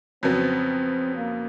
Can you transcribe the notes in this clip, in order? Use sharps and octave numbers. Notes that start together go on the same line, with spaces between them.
F2 C#3 F#3 B3 C4
A#3